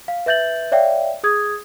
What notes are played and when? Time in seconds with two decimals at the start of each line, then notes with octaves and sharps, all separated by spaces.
0.08 F5
0.26 B4 E5 G6 A6 F#7
0.72 C#5 D5 E5 F5 G5
1.24 G#4 D#6 G#6